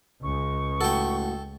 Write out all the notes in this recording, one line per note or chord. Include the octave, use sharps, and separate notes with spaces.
C#2 G#3 C#6
A2 F#4 A4 G5